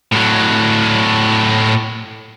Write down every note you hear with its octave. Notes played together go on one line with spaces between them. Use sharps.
A2 F#3